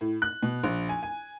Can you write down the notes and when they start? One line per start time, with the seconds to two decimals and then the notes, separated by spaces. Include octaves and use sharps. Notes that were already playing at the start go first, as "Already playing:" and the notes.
0.01 A2
0.22 F#6
0.43 B2
0.64 A#1
0.89 G#5
1.03 G#5